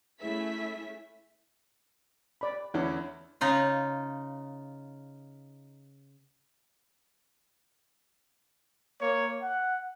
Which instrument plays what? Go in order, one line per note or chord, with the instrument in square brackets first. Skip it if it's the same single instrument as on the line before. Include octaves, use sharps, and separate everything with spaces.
[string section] A3 C#4 E4 G#4 E5 B6
[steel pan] D5 B5
[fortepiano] E2 D3 C#4 [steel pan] E4
[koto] C#3 D#4 F4
[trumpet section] A#3 C#5
F#5